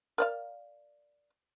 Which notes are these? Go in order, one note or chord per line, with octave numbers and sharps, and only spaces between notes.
A#4 D5 F5